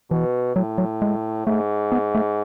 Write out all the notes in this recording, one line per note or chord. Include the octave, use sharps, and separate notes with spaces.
B2 E3
A2 F#3
F#3
G#3
G#2 A3
B3
A3